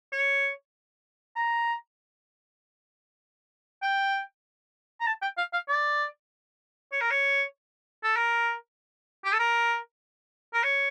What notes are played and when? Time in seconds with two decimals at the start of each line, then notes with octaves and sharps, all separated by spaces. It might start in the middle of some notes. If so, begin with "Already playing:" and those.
0.13 C#5
1.36 A#5
3.83 G5
5.01 A#5
5.07 A5
5.22 G5
5.38 F5
5.53 F5
5.68 D5
6.92 C#5
7.01 A#4
7.11 C#5
8.04 A4
8.16 A#4
9.25 G4
9.33 A4
9.39 A#4
10.54 A#4
10.64 C#5